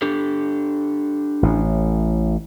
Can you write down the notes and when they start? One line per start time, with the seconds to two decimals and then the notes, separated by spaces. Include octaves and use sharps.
0.02 D4 G4 A4
1.43 A1 A2